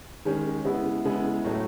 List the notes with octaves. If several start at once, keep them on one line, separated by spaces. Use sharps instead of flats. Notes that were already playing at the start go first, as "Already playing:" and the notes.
D#3 G#3 C#4
C#3 G#3 B3 E4
C#3 G#3 B3 E4
A2 F#3 A3